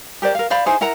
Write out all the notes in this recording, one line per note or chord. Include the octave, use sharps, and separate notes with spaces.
G4 A#4 C5 D5
A#4 F5
C5 D5 F5 B5
D#4 E4 G#4 C5
E4 A#4 F#5 A#5